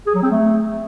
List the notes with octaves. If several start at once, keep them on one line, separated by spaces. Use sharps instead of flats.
G#4
F#3
C4
A3